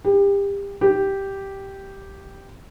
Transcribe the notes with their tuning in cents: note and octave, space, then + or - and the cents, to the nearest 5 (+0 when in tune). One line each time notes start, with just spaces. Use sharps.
G4 +30
G4 -5